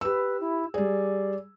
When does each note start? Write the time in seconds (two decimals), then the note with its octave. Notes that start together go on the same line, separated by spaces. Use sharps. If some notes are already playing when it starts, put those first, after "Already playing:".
0.01 G4 B4 E6
0.40 E4
0.74 G3 G#4 D5